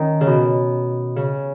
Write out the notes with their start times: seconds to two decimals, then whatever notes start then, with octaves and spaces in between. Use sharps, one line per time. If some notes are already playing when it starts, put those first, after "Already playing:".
Already playing: D#3 C#4 D#4
0.21 C#3
0.27 B2
1.16 C#3